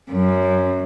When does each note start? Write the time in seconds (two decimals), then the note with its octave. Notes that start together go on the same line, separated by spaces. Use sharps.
0.12 F#2